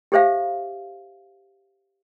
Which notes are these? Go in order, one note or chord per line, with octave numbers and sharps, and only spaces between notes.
G4 A4 C5 E5 F5